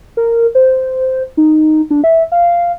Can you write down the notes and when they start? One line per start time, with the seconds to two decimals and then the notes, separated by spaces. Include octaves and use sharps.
0.17 A#4
0.55 C5
1.37 D#4
1.91 D4
2.04 E5
2.32 F5